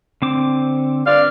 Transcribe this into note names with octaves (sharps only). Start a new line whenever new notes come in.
D3 C4 D6
G2 D5 F5